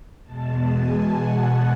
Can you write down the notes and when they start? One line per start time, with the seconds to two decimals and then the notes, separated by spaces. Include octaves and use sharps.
0.24 E2 B2 G#3 A5
0.67 G#5
1.08 F#5